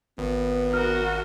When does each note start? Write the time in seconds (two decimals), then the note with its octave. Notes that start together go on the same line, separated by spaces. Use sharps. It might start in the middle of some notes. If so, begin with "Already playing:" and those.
0.18 G#1 B3
0.73 F#4 A#4 F6